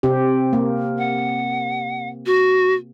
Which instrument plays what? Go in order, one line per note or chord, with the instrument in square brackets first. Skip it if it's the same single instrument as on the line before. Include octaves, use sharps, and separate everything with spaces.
[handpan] C3 C4 G4
A#3
[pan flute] F#5
F#4